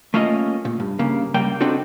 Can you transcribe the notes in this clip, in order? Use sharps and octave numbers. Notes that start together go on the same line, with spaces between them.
A3 A#3 C#4 F4 D#5
A#2
G2
G2 C#3 A#3
C#2 G2 G3 A#3 G5
C4 D4 D#4 F#4 A4